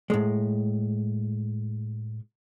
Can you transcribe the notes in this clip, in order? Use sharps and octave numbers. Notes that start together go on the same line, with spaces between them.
A2 G#3